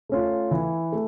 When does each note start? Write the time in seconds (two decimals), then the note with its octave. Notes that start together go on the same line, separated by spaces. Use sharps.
0.09 A3 C#4 F4
0.51 E3
0.92 A3